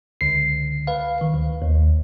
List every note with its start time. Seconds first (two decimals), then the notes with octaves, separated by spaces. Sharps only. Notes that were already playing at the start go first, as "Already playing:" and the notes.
0.21 C#2 D3 C7
0.87 B4 F5
1.21 D#3
1.34 D2
1.62 D#2